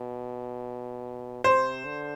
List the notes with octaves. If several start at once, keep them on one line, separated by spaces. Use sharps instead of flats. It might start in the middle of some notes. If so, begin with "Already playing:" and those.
Already playing: B2
C3 C5
D3